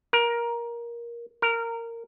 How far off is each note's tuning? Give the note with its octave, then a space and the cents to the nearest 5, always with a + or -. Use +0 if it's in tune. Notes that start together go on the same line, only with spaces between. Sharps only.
A#4 +15
A#4 -15